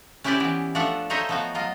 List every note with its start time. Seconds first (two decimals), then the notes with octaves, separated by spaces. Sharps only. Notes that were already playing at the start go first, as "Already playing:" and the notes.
0.24 C#4 E4 G4 B4 C5 D5
0.40 E3 B3
0.75 F3 A3 D4 E5 F#5
1.10 A3 D#4 C5 C#5 D#5 E5
1.29 F3 B3 F#4
1.54 F#3 F4 D#5